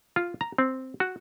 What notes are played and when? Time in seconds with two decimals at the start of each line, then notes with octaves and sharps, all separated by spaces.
0.16 F4
0.41 A#5
0.58 C4
1.00 F#4